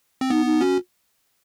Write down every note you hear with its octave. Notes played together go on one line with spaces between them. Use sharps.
C4
B3 D#4
D#4
C#4 F#4